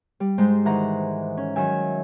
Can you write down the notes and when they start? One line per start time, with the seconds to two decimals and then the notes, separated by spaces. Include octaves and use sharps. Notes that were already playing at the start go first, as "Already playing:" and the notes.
0.20 G3
0.38 G#2 G#3 C5
0.65 D#3 E3 F#5 A#5
1.37 C#4
1.56 D#3 F#3 E5 G#5